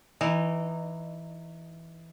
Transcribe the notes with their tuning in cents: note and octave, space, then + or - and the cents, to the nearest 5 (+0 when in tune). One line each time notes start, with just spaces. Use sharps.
E3 +0 D#4 -20